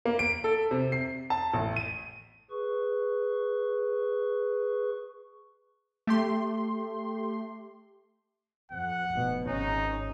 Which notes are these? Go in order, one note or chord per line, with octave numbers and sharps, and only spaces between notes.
A#3
D7
A4
C3
C7
A5
A1
D#7
G#4 B4 C#6
A3 G4 C6
F2 F#5
F1 B2
G#1 C#4 D#4